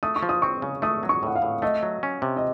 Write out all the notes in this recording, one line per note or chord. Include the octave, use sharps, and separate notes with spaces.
A3 D#6
C#6
F3
D#6
C4 C#6
C#3
A3 D#6
F#3
C#6
A2 F#5
F5
A2
A3 D#5
F#3
C#4
C3
D#5